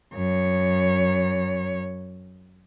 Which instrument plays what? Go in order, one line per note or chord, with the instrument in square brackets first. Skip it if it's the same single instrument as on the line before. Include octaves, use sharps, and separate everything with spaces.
[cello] F#2 C#5